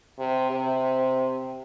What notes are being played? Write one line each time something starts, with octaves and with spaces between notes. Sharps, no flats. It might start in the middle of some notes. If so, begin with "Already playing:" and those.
C3
C3